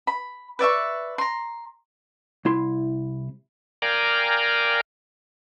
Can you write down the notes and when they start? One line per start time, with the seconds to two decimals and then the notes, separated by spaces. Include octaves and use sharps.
0.07 B5
0.59 B4 D5 E5 C#6
1.18 A#5 C6
2.45 C2 E4 C6
3.82 A#4 D5 F5 G5 G#5 A#5